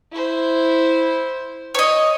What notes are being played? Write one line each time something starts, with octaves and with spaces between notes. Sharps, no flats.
E4 C5
C#5 D#5